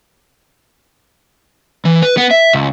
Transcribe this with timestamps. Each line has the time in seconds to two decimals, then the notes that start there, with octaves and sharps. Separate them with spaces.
1.85 E3
2.03 B4
2.17 B3
2.31 E5
2.53 C#2